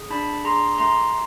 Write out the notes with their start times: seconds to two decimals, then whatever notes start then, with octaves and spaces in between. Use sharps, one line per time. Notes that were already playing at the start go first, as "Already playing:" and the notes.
Already playing: G#4
0.10 D4 A5 B5
0.44 G#4 A#5 C6
0.78 A3 A#5 C6